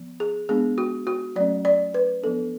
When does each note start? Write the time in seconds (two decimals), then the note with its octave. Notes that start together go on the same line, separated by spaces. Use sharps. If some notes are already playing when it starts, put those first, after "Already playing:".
Already playing: F3 B3
0.20 G#4
0.49 G#3 B3 D4 G#4
0.78 F#4
1.07 F#4
1.36 F#3 A3 C#4 D5
1.65 D5
1.94 B4
2.23 F3 B3 D4 A4